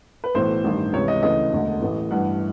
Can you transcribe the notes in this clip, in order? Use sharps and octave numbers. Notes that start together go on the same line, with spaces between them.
B4
B1 A2 E3 C5
A1 G2 D#3
C#2 C3 E3 C#5
D#5
D2 C#3 E3 D#5
E1 D2 D3
A1 A2 E3
A1 G2 E3 F#5